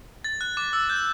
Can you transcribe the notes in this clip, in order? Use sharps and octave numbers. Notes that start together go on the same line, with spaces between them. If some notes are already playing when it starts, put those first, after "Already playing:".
A6
F#6
D6
E6
G6